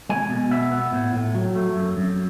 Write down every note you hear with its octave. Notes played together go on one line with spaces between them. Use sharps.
G#3 G#5
B2
B3 E5
B3
A2
A2
F#3
A3
F#2
F#2